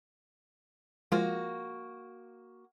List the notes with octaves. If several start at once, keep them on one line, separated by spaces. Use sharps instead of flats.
F3 G#3 A#3 F4 F#4